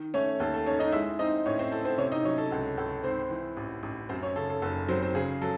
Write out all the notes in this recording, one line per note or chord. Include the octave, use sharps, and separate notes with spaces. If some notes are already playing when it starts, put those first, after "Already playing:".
Already playing: D#3
A3 C#4 C#5
D#2 A4
A4
C#4 D#4 C#5
D#4 D#5
G#3 E4 E5
C4 D#4 D#5
A2 C#4 C#5
C4 C5
E4 A4
C4 C5
C3 C#4 C#5
D#4 D#5
F#3 C#4 C#5
A4
C#2 A4
C#2 A4
G#2 C4 C5
E3
A1
A1
F#2 C4 C5
C#4 C#5
C#3 A4
A4
F#1 A4
F#3 C4 C5
C4 C5
C#3 G#4
F#3 A4